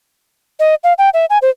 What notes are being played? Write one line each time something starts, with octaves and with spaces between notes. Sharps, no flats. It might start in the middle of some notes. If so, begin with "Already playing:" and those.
D#5
F5
G5
E5
G#5
C5